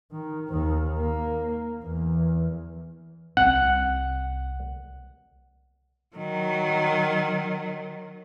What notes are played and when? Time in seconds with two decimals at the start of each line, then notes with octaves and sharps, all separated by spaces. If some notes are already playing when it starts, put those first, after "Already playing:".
0.12 D#3
0.50 D#2 D#3
0.99 A#3
1.83 E2
3.37 C2 C4 F#5
6.16 D#3 F#3